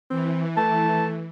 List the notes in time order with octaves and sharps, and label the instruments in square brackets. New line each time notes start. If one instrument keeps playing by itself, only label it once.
[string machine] E3 [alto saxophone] C4
[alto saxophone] A3 [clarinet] A5